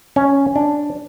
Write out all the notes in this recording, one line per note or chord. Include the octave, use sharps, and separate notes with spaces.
C#4
D4